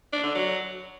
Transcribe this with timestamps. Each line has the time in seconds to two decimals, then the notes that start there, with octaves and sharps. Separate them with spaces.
0.12 D4
0.24 D3
0.35 F#3